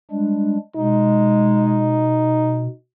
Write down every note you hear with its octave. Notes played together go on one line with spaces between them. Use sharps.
G3 G#3 D4
B2 G#3 D#4